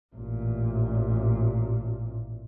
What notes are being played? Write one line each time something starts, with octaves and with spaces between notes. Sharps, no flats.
A1 A#2